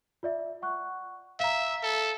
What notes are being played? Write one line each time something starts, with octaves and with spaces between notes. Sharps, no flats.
F4 D5 E5
F#5 C#6 F#6
E5 F5 A#5
A4